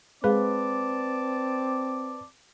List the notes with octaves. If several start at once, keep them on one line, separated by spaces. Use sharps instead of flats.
G#3 C4 G#4 B4 D5 F5 A5 D6